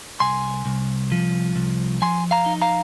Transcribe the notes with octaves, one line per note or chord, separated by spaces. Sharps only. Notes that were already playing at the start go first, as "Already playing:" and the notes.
C2 G#5 C6
C2
F3
C2
F3 G#5 C6
F5 A#5
D#4
F5 A#5